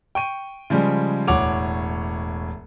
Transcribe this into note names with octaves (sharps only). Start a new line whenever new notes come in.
G5 C#6 D#7
C#3 F3 G3 G#3
E1 A2 C#5 F#5 D6 F7